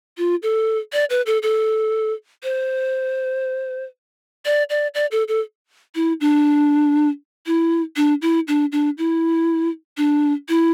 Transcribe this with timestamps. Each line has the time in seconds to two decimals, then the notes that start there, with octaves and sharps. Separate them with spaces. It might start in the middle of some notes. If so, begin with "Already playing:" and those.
0.18 F4
0.43 A4
0.93 D5
1.10 B4
1.26 A4
1.43 A4
2.43 C5
4.45 D5
4.70 D5
4.95 D5
5.12 A4
5.28 A4
5.95 E4
6.21 D4
7.47 E4
7.96 D4
8.22 E4
8.48 D4
8.72 D4
8.98 E4
9.97 D4
10.49 E4